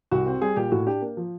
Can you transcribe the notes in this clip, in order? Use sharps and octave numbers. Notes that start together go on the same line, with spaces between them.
C2 F#4
C4
G3 G#4
A#2 G4
A2 F#4
D4 G4
A#3
F3